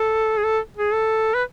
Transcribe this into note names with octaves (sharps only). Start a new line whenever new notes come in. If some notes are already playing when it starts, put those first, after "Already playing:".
Already playing: A4
G#4
A4
G#4
A4
B4